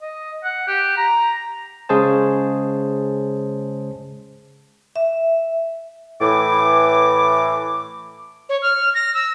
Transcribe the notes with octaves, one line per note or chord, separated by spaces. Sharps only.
D#5
F#5
G4
A#5
C#3 G#3 G#4 C5 A5
E5
A2 E3 D6
C#5
F6
A#6
E6